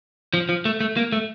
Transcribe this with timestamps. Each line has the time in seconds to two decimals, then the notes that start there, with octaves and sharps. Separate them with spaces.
0.34 F3
0.49 F3
0.65 A3
0.80 A3
0.97 A#3
1.12 A3